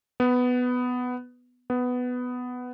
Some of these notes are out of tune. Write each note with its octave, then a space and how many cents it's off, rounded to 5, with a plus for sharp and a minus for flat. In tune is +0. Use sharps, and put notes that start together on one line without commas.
B3 +10
B3 +10